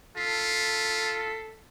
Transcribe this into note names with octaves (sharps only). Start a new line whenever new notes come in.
F4 A4 B6 C7